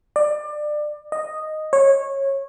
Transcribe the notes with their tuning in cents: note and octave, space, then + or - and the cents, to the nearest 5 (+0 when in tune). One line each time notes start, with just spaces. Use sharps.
D5 +25
D#5 -5
C#5 -20